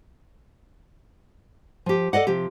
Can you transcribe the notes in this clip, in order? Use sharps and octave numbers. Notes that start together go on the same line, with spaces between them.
F3 G4
A4 D5 D#5 F#5
C3 F3 G4